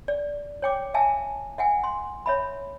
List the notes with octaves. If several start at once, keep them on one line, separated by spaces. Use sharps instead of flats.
D5
C#5 G5 D6
E5 F5 G#5 A5
E5 F#5 G#5
C6
C#5 E5 B5